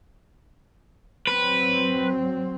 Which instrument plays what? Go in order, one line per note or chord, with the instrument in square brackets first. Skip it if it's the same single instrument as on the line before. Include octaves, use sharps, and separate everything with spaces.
[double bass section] F#3 C4 [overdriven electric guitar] B4